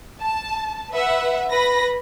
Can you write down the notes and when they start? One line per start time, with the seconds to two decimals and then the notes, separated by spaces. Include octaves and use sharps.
0.20 A5
0.91 B4 E5 F#5
1.51 B4 B5 A#6